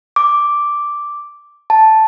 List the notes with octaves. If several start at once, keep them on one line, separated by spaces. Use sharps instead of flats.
D6
A5